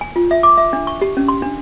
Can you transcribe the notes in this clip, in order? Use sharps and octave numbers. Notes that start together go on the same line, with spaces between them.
G#5
F4
E5
D6
E5
D4
C#6
G4
C#4
C6
D4